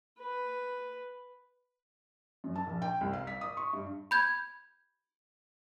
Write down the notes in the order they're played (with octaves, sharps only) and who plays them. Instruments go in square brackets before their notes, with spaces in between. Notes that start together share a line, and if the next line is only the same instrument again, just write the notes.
[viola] B4
[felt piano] F#2
A5
A#1
G5
C2
F5
B6
D#6
C#6
G2
[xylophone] B5 G6 G#6